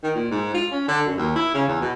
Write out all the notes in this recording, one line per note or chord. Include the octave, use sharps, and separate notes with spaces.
D#3
A#2
G#2
F4
C#4
D3
F#2
D#2
E4
C#3
E2
B2